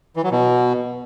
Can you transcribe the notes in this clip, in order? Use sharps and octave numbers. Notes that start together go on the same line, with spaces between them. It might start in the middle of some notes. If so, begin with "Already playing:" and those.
E3
F#3
B2